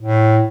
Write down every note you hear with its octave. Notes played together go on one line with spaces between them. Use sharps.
A2